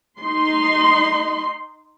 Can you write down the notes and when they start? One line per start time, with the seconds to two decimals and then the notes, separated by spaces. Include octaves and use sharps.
0.20 D#4 C6